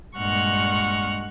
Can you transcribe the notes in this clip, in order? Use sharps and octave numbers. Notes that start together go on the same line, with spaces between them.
G2 A#2 G#3 F#5 C#6 F6